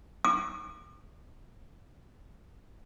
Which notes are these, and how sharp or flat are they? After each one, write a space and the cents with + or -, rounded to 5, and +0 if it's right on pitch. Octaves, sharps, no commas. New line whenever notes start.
D6 +45